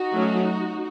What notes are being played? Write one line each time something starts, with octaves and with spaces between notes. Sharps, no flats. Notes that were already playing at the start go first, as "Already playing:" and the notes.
Already playing: D#4 F#4
F#3 A3 C#4